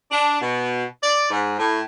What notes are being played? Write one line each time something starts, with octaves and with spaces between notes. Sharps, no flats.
D4
B2
D5
G#2
A2